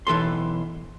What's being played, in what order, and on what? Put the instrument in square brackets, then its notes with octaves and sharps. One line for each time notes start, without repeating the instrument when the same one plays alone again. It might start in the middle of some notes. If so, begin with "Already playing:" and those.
[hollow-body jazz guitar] B1 E3 A4 C6